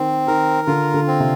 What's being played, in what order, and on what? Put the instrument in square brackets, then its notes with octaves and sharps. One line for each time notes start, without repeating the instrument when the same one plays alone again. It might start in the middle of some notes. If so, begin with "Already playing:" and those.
Already playing: [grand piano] D#3 [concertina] C4
[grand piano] D#3 [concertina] A#4
[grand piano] D3 [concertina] F4
[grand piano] D3
[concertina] C4
[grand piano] C3